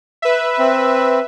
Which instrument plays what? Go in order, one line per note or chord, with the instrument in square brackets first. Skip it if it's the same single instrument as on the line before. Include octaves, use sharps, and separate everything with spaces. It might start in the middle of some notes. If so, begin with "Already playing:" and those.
[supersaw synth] B4 E5
[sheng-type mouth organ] C4